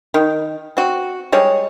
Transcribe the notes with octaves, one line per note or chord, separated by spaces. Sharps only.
D#3
C4 F#4
G3 G#3 C#5